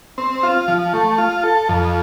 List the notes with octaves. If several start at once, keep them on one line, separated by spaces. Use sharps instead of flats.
C4
F4
F3
A3
F4
A4
F2